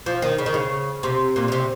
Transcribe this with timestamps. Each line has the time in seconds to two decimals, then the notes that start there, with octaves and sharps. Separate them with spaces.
0.06 F3
0.22 D#3
0.38 C#3
0.46 D#3
0.54 C#3
1.03 C3
1.36 A#2
1.48 C#3
1.52 C3